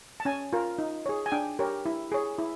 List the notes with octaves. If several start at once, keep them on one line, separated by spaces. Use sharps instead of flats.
A5
C#4 G#5
F4 A#4
D#4
G#4 C#5
G#5
D4 G5
G4 A#4 C#5
E4
G#4 C#5
E4